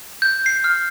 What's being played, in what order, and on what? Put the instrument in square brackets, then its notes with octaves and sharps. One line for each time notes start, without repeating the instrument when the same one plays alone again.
[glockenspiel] G6
C7
F6